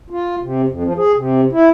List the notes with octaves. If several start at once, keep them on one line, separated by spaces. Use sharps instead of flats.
F4
C3
F2
F3
G#4
C3
E4